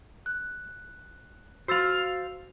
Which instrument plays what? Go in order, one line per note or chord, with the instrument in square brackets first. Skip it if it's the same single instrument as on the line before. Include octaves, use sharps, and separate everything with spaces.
[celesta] F#6
[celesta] F#4 E6 A6 [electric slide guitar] C5 F5